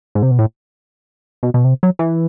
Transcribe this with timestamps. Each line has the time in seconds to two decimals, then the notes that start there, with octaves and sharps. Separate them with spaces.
0.15 G#2
0.23 C3
0.31 B2
0.39 A2
1.43 B2
1.54 B2
1.64 C3
1.83 F#3
1.99 E3